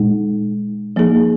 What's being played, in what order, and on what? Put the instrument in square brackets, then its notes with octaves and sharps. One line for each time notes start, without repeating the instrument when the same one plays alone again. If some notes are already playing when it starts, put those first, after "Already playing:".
Already playing: [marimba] A#2 G#3 D#4
F3 A#3 D#4 G#4